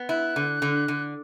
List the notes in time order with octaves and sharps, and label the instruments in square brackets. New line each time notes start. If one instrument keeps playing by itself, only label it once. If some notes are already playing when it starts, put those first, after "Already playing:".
Already playing: [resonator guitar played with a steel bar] B3
[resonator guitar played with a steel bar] E4 [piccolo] F#6
[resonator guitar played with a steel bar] D3
D3
D3